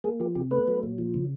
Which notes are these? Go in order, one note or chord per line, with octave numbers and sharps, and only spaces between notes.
G#3 A#3 G#4
F3 G4
C3 G4
A3 B3 B4
F#3
A#2
F3
C#3